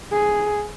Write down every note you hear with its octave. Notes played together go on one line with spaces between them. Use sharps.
G#4